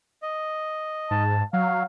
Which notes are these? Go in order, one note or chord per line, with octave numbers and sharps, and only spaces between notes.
D#5
G#2 A5
F#3 F5